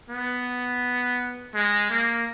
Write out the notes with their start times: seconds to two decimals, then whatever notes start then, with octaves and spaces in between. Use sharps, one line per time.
0.10 B3
1.54 G#3
1.90 A#3